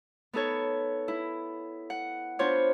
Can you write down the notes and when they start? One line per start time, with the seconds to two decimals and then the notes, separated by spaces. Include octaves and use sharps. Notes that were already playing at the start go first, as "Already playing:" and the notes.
0.33 B3 D#4 A4 C#5
1.08 E4
1.90 F#5
2.39 B3 D4 F4 C5 C#5